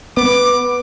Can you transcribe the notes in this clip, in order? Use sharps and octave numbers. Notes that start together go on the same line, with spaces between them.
B3 D6